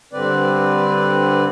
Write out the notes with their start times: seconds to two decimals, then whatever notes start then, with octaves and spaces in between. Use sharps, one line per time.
0.13 G2 D3 C4 B4 D5